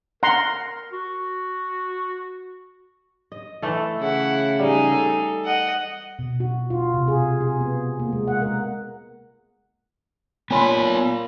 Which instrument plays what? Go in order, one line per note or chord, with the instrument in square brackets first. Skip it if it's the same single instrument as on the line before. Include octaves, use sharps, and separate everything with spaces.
[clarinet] A#4 [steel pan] F#5 A#5 C6
[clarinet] F#4
[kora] D#5
E3 A3 A4
[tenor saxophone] C#3 [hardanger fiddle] E4 F#5
[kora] G3 [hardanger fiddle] D#4 G#4
[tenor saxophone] A4
[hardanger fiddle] D#5 F#5
[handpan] B2
F#4
F4
C3
G#4
G#4
B3
A#3
G#3
F#5
A#4
[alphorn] A#2 [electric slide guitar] B3 C#5 [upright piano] G#5 B5 C6